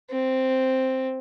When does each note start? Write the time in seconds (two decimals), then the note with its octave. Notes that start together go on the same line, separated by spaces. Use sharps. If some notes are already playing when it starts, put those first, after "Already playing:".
0.11 C4